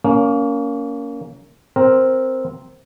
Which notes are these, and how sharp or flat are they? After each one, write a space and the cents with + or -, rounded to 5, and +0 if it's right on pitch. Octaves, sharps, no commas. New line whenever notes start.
A#3 +0 C#4 +25
C4 +0 A#4 +0